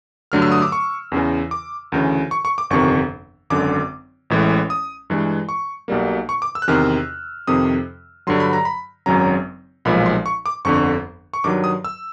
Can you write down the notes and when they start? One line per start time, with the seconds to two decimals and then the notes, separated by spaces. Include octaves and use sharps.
0.32 G2 D3 F#3 A3 F6
0.42 E6
0.52 D#6
0.62 D6
0.72 C#6
1.12 E2 C#3 E3
1.51 D6
1.92 D2 C#3 E3
2.31 C#6
2.45 C#6
2.58 D6
2.70 G1 F2 C3 D#3 C#6
3.50 G#1 F#2 D3 D6
4.30 A1 A2 E3 G#3
4.70 D#6
5.10 G2 E3 G#3
5.49 C#6
5.88 B1 B2 G3 A#3
6.29 C#6
6.42 D6
6.55 E6
6.62 F#6
6.68 E2 C3 D#3 F6
7.47 F2 C3 D#3 D#6
8.27 G2 D3 F#3 C6
8.40 B5
8.53 A#5
8.65 B5
9.06 G#1 F#2 C#3 F#3 A#5
9.85 B1 A#2 F3 G#3 B5
10.06 C6
10.26 C#6
10.46 D6
10.65 G1 F2 D3 C#6
11.34 C#6
11.44 G2 D#3 F#3 D6
11.64 D#6
11.84 E6